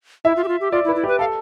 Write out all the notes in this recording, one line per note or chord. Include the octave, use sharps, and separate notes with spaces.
E4 E5
F4
G4
F4
G4
F4 D5
E4
B4
E4
G4 B4
A4 F5